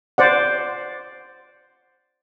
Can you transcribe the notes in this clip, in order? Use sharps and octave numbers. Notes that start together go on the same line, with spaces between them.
C5 D5 F#5